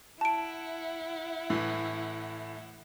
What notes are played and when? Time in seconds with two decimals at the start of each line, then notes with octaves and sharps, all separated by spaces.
0.21 E4 F#5 A5 D7
1.50 A2 E3